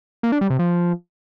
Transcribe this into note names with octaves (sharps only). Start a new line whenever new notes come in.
A#3
D4
G3
C3
F3